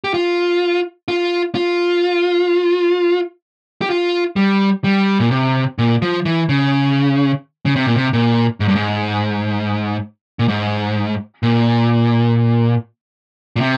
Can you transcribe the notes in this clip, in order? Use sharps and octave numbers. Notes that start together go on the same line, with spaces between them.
G4
F4
F4
F4
G4
F4
G3
G3
A#2
C3
A#2
F3
E3
C#3
C#3
C3
A#2
C3
A#2
G#2
G2
G#2
A#2
G#2
A#2
A#2
C3